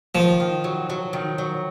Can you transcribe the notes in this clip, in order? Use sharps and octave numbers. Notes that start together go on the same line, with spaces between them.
D#3 F3
D#3
F#3
F#3
D#3
F#3